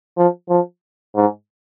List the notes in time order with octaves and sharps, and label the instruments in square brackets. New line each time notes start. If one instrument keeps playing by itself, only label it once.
[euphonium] F3
F3
G#2